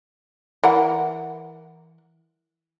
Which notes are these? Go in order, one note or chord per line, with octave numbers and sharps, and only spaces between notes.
E3 A#4 F#5